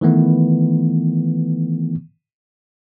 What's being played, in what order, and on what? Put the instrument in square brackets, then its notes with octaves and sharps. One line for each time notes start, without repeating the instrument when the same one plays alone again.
[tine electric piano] D#3 E3 A3 B3